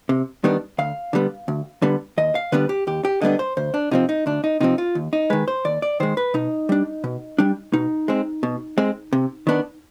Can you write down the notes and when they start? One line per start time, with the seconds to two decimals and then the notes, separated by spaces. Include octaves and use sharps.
0.09 C3
0.44 D#3 G3 B3 D4
0.78 D2 F5
1.13 D3 G3 B3
1.48 D2
1.82 D3 G3 B3
2.18 D#2 D#5
2.35 F5
2.52 D3 G3 B3 D4 B4
2.69 G4
2.87 D#2 G4
3.05 G4
3.21 D3 G3 B3 D4 D#5
3.39 C5
3.57 D2 C5
3.74 D4
3.91 C3 F3 C4 D#4
4.09 D#4
4.26 D2 D4
4.44 D#4
4.60 C3 F3 C4 D#4
4.78 F4
4.95 D#2
5.13 D#4
5.30 D#3 G#3 B4
5.48 C5
5.65 D#2 D5
5.82 D5
6.00 D#3 G#3 C5
6.17 B4
6.34 B2 D#4
6.69 G3 D4
7.04 B2
7.38 G3 D4
7.73 B2 D#4
8.08 G#3 C4
8.43 B2
8.78 G#3 C4
9.13 C3
9.47 D#3 B3 D4